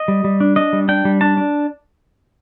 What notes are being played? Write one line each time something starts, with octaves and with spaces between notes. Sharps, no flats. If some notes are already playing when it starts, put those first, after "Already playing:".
Already playing: D#5
G3
G3
D4
D4 D#5
G3
D4 G5
G3
D4 A5
D4